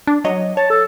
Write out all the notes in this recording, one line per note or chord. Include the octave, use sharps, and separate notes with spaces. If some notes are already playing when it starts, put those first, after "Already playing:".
D4
F#3 C#5 D#5
C#5 A5
A4